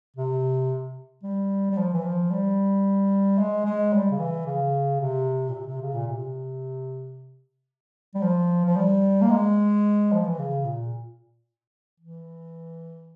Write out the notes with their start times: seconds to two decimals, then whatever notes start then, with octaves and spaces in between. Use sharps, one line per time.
0.16 C3
1.23 G3
1.71 G3
1.78 F3
1.94 E3
2.04 F3
2.31 G3
3.38 G#3
3.65 G#3
3.93 G3
4.11 C#3
4.19 E3
4.46 C#3
5.00 C3
5.49 A#2
5.54 C3
5.67 C3
5.82 C#3
5.94 A#2
6.08 C3
8.15 G3
8.23 F3
8.66 F3
8.76 G3
9.22 A#3
9.31 G#3
10.13 F3
10.25 E3
10.39 C#3
10.65 A#2
12.00 E3